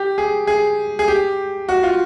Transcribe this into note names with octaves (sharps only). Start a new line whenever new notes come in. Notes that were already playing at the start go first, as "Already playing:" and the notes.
Already playing: G4
G#4
G#4
G#4
G4
F#4
F4